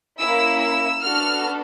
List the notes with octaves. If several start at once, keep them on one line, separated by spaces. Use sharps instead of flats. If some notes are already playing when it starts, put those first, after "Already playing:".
A#3 C#4 E4 E6
E6
B3 D4 F#4 A4 F6